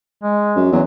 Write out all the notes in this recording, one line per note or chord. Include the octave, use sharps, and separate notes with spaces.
G#3
F#2
E2 F#3